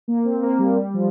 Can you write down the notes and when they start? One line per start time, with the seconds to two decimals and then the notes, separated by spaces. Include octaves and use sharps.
0.08 A#3
0.25 C4
0.42 A#3
0.59 G3
0.77 G3
0.94 F3